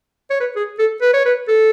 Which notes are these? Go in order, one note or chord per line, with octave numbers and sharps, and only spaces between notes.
C#5
B4
G#4
A4
B4
C#5
B4
A4